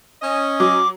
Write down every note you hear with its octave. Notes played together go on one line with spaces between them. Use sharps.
C#4 D#5
F#3 D6